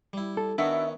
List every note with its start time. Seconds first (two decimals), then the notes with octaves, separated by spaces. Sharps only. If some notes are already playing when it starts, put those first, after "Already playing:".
0.13 G3 E4
0.37 A4
0.58 D#3 B3 C#4 D4 E4 F#4 E5